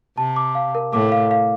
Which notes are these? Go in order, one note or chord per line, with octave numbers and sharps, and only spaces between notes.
C3 A5
D6
F5
A#4
A2 D6
F5
F5